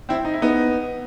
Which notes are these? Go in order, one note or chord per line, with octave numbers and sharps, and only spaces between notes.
C4 E4
D#4
E4
B3 D#4